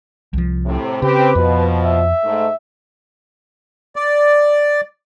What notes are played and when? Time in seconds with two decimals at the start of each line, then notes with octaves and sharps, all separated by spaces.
0.33 C2 F3
0.66 A2 C3
1.02 C#3 C4 G4 B4
1.35 F2 B2 F3
1.83 E5
2.24 G#2 A3
3.96 D5